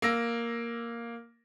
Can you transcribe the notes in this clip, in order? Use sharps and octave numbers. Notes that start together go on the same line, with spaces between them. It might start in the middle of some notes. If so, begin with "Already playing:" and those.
A#3 E6 A#6 D7